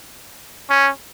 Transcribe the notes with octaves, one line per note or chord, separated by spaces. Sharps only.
C#4